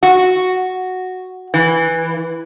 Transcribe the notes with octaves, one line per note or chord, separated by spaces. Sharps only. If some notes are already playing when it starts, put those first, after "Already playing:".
F#4
E3